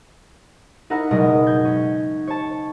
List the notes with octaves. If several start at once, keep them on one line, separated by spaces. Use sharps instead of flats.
D#4 E4 A#4 F#5
F#1 B2 G#3 A#4 D#5 D#6
G6 G#6
C#4
C#5 A5